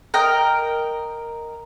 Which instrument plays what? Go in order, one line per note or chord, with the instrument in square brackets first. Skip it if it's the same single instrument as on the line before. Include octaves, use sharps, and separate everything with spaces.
[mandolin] A#4 D#5 G5